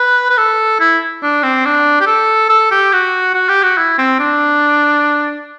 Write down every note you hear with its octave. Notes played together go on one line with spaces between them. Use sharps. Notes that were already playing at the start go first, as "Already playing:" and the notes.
Already playing: B4
B4
A4
E4
D4
C4
D4
G4
A4
A4
G4
F#4
F#4
G4
F#4
E4
C4
D4